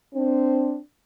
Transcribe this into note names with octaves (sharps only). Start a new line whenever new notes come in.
C4 D4